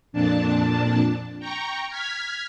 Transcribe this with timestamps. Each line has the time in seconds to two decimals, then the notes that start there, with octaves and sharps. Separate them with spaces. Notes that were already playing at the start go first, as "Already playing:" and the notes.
0.12 F2 A#2 D4 A5
1.39 G5 A#5 C#6
1.89 F6 G#6 B6